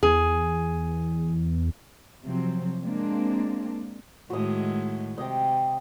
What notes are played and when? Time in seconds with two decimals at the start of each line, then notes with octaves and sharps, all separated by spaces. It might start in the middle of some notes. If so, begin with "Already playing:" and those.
0.03 E2 G#4
2.24 C3 F3 F#3 C4
2.83 G#3 A#3 C4 D4
4.30 A2 D#3 G#3 F#4 D#6
5.18 C3 D#5 G5